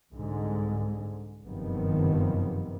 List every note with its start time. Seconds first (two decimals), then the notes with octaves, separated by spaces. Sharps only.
0.12 C2 G#2 D3 G#3
1.45 F#1 G2 C3 D#3 F3 B3